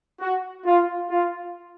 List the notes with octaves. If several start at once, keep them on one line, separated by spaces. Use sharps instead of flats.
F#4
F4
F4